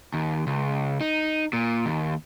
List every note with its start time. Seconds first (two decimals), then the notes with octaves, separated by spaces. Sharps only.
0.14 D#2
0.47 C#2
1.01 D#4
1.53 A#2
1.86 D#2